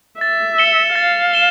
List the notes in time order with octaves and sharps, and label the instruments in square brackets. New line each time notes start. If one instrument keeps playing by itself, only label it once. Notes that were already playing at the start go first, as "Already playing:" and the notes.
[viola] E5 [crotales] A6
[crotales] C#7 E7 G7
[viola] F5 [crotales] A6
[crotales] E7 G7